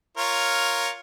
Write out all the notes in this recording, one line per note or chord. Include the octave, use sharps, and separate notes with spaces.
F4 A#4 C#5